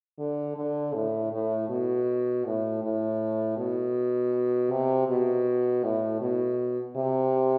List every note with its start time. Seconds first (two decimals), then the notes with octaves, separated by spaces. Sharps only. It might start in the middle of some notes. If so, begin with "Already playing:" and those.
0.19 D3
0.57 D3
0.94 A2
1.32 A2
1.69 B2
2.45 A2
2.83 A2
3.57 B2
4.71 C3
5.08 B2
5.83 A2
6.21 B2
6.96 C3